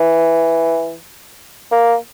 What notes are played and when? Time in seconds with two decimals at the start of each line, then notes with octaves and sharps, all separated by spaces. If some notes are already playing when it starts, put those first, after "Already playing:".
Already playing: E3
1.72 A#3